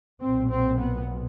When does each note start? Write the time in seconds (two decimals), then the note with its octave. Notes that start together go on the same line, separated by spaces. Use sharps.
0.20 B1 A#2 C4
0.49 C4
0.79 B3